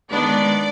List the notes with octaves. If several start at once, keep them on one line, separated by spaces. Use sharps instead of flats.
D#3 G#3 B3 D4 D5